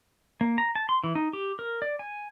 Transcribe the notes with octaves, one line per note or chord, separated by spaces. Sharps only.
A#3
A#5
A5
C6
E3
D#4
G4
A#4
D5
G#5